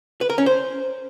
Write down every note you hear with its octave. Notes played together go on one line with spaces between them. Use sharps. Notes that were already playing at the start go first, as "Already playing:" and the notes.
B4
A#4
C#4
C5